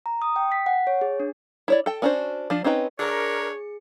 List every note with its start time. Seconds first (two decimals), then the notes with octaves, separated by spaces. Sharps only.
0.06 A#5
0.22 D#6
0.36 G5
0.52 B6
0.66 F#5
0.87 C#5
1.01 G#4
1.20 D4
1.68 E4 C#5 D5
1.86 A4 G5
2.02 B3 C#4 D4 F#4 C5
2.50 F3 D4
2.64 C4 C#4 D#4 B4 G5
2.99 D4 G#4 A#4 C#5 C#7